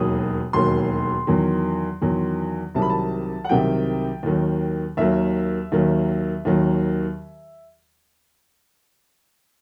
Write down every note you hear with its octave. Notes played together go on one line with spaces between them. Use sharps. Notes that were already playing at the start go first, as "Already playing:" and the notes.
Already playing: E1 D#2 D#3 F#3 D#6
E1 D#2 D#3 F#3 C6
E2 D#3 F#3
E2 D#3 F#3
C2 C3 D#3 F#3 A5
B5
A5
F#5
C2 C3 D#3 F#3 G5
D#2 D#3 F#3
D#2 D#3 F#3 E5
D#2 D#3 F#3
D#2 D#3 F#3